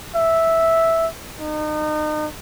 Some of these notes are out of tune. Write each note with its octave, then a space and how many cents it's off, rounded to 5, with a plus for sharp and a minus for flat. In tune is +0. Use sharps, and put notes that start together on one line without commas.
E5 -5
D#4 -35